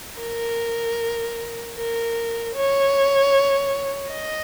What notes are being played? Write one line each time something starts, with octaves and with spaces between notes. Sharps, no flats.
A#4
A#4
C#5
D#5